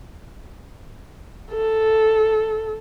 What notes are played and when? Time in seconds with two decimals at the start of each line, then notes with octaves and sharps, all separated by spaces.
1.52 A4